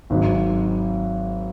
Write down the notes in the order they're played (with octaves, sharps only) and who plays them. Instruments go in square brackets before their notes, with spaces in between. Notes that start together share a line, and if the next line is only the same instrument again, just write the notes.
[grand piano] G#1 G#2 F#3